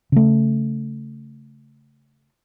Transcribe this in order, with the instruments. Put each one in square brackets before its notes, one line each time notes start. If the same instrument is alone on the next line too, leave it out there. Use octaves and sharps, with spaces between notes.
[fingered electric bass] C#3 A3